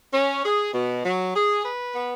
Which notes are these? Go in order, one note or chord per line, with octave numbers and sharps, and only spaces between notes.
C#4
G#4
B2
F#3
G#4
B4
B3